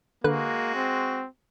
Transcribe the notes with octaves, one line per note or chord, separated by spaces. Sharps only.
D3 G#3 A#3 F#4 B4 F#6
C4